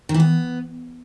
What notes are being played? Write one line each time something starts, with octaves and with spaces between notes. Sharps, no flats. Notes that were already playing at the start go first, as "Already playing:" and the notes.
D#3
E3
B3